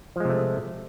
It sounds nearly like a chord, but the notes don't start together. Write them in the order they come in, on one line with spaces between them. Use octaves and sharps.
F3 G#3 C3 A3